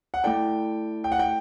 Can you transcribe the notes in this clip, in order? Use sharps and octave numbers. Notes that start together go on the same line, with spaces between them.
F#5
A3 E4 A4 D5 G5 A5
G5
F#5
G5